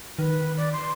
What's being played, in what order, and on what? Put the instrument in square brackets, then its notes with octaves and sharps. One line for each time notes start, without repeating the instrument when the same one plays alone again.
[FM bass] D#3 [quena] B4
[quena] D5
C6